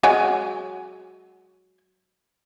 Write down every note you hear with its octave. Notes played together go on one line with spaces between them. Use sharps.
F#3 G#3 G#5